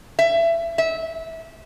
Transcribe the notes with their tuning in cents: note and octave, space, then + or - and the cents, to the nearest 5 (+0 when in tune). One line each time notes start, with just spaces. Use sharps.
E5 +25
E5 -20